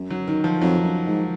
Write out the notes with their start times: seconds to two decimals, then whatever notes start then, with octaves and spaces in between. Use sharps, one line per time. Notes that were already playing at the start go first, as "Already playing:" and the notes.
Already playing: F#2
0.10 F#3
0.28 D#3
0.44 F3
0.62 F2 F#3
0.84 F#2
1.07 G#2